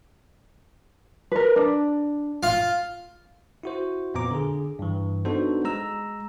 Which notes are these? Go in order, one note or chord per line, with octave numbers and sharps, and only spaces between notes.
A#4 B4
D4
F4 F5
E4 F#4 C5
F2 A#2 B3 A#5 D6
D3 G#4
G2 E3
B3 D4 D#4 F#4 A4 C5
G#3 A#5 E6